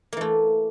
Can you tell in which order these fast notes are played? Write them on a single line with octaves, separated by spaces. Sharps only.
A#3 E3 A3